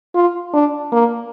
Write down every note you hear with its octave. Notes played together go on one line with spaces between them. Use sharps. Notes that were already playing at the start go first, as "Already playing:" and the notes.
F4
D4
A#3